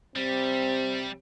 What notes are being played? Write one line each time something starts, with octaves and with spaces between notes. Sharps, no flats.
C3 G3 C4